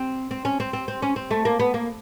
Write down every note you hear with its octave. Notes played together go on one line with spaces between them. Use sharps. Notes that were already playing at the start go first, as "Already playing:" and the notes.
Already playing: C4
C4
C#4
C4
C4
C4
C#4
C4
A3
A#3
B3
A#3